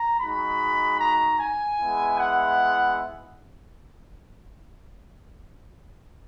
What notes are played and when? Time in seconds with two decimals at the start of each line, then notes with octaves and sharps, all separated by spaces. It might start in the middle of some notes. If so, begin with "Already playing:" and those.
Already playing: A#5
0.20 G#3 D#4 F#4 B5
1.00 A#5
1.40 G#5
1.79 G#3 B3 E4
2.19 F#5